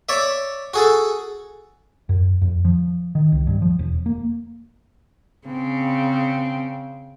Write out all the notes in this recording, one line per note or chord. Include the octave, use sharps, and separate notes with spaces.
C#5 D5 E5
F#4 G#4 A4
F#2
F2
F3
D#3
C2
G2
F3
E1
A#3
C#3 C4